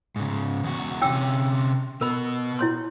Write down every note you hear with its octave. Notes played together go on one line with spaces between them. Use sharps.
G#2 C#3
E2 F#4
C3 C#4 G5 D6 E6
B2 B3 A#4 B5
E4 C#5 C6